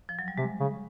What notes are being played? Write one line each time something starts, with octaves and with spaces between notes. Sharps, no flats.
F3
F#3
G3
C3 G#3
C#3